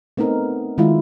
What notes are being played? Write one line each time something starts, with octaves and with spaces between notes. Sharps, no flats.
A3 B3 C4 D#4 A#4
D#3 G#3 E4 F4